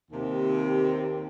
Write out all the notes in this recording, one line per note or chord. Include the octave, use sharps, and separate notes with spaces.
D#2 C3